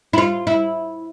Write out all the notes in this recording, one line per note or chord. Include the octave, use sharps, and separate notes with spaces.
E4
F4
E4